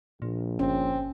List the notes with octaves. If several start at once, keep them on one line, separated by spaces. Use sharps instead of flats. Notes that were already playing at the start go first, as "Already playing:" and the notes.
A#1 A#2
G1 C4 C#4